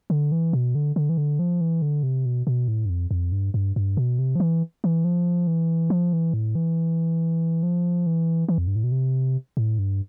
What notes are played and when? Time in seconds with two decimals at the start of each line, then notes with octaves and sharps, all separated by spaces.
0.10 D3
0.32 E3
0.53 B2
0.75 D3
0.96 D3
1.09 E3
1.18 D3
1.39 F3
1.61 E3
1.82 D3
2.03 C3
2.26 B2
2.47 B2
2.68 A2
2.85 G2
2.90 F2
3.11 F2
3.32 G2
3.54 G2
3.76 G2
3.97 B2
4.19 C3
4.35 F3
4.40 E3
4.84 E3
5.05 F3
5.47 E3
5.90 F3
6.13 E3
6.34 A2
6.55 E3
7.63 F3
8.06 E3
8.49 E3
8.58 F2
8.67 G2
8.76 A2
8.84 B2
8.92 C3
9.57 A2
9.79 G2